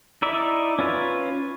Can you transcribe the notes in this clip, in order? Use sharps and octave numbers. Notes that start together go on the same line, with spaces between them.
D#4 E4 D5 E5
C#4 F4 B4 C#5